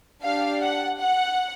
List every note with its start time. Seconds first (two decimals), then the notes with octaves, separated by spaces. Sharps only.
0.23 D4 G4 F5
0.62 F#5
1.00 F#5